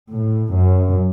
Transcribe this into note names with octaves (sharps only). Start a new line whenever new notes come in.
A2
F#2